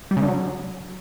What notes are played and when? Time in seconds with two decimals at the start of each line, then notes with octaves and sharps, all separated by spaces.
0.11 G3
0.17 C#3
0.22 D3
0.28 F#3